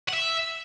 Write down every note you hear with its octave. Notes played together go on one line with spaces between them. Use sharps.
F#5
E5